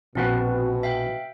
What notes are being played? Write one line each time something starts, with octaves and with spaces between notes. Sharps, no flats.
A#1 B2 F3 C4 F#4 B4 F#5
E5 F5 G5